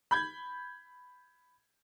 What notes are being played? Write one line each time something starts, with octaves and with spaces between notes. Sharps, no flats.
B5 G6 G#6